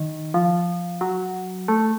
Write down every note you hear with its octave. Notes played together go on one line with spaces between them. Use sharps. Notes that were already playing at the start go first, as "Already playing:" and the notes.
Already playing: D#3
F3
F#3
A3